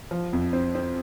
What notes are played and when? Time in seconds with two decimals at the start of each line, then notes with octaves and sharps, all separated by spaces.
0.11 F3
0.33 F2
0.53 C4
0.75 C4